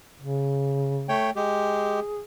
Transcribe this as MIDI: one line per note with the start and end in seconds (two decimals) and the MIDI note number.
0.21 1.17 49
1.09 1.31 57
1.09 1.31 73
1.09 1.31 79
1.36 2.00 56
1.36 2.00 67
1.36 2.22 68